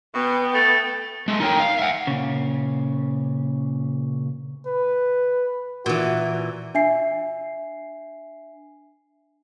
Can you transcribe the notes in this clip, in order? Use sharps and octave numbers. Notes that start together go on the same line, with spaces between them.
B2 B3 G5
A3 A6
G#3 A3
D#4 A#4 C#5 G5
F5
E5 F#5
A#2 C#3
B4
A#2 E3 F#4
D4 E5 G#5 C7